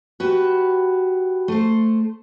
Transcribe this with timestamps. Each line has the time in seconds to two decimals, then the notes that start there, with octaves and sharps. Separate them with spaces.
0.20 F#4 G4 B4
1.48 A3 C5